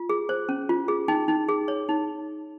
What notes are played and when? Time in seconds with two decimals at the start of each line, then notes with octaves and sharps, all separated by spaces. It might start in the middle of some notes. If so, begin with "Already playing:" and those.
Already playing: F4
0.09 G#4
0.29 C5
0.49 C#4
0.69 F4
0.88 G#4
1.08 D#4 G5
1.28 D#4
1.49 G#4
1.68 C#5
1.89 D#4